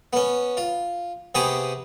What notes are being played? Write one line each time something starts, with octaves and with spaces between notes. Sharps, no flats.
B3 C#4
F4
C3 B3 G4 G#4 C#6 D#6